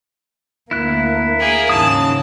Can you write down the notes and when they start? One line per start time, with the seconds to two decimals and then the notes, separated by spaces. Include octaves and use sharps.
0.71 D2 A#3 E4 F#6
1.06 E4
1.40 A#3 G#4
1.69 D#2 G#2 C#3 F#3 A5 D#6